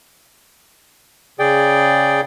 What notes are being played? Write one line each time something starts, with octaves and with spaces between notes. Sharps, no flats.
C#3 G#4 D5 G5